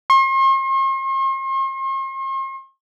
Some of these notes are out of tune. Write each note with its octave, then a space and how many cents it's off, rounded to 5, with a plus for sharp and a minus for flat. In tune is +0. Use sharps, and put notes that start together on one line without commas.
C6 +45